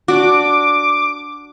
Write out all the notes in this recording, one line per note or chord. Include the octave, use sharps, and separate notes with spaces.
D4 F#4 D6